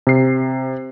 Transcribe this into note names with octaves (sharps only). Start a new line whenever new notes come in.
C3 C7